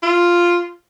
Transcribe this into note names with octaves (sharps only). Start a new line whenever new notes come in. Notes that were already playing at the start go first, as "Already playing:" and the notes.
F4